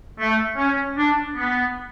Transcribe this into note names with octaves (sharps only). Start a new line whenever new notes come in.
A3
C#4
D4
B3